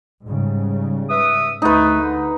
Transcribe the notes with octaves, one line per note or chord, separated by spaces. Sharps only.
G#2 C#3 G3
B4 E5 D#6
D2 A3 D#4 B4
D3